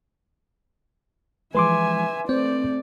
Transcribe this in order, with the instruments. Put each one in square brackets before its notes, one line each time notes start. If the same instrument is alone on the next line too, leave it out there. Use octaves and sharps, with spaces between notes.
[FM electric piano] E3 F3 G#3 [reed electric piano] B4 C6 D6 [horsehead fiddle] E5 G#5
[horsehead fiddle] A3 D5 [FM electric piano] C4